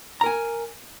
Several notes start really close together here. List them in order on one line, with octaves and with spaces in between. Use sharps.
A#5 A#4 G#5